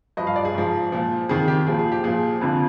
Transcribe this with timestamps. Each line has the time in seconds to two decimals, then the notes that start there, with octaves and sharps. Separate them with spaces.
0.17 G2 F3 D#5
0.27 F5
0.36 D5
0.45 G#4
0.54 G#2 F3
0.92 A#2 F3
1.29 F2 D#3 G#4
1.48 G4
1.67 A#2 F3 G#4
1.79 G#4
1.92 G4
2.04 A#2 F3 G#4
2.41 F2 D3 F3